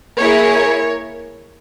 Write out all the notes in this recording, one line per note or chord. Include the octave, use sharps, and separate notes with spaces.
A#3 E4 G#4 A#4 C#5